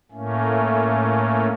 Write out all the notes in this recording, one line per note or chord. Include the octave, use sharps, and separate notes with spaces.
A2 A3 A#3 C#4